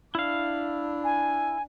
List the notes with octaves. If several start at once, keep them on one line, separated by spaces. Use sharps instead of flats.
D4 E4 F5
G#5